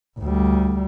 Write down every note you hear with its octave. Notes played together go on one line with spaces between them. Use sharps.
D2 G3